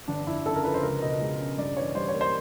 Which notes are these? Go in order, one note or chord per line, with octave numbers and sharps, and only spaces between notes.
G1 D4
F2 E4
C#3 A4
A#4
F3 B4
C5
C#2 A#4
B2 D#5
G#3
C#4
G2 D5
E3 C#5
G3 C5
C#5
A#3
C5